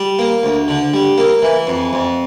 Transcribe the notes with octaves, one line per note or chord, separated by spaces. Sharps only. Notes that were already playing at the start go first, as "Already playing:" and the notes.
Already playing: G3
A#3
D2
D3
G3
A#3
E3
F2
F2